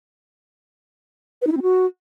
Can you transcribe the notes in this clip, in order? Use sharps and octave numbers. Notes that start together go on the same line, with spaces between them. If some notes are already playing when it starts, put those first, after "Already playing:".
B4
D#4
E4
C4
F#4